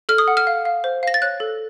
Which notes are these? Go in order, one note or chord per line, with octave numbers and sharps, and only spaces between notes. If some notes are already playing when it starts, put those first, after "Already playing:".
A4 F6
D#6
F#5
F6
F5
F5
C5
F5 A#6
A6
C#5 F#6
A4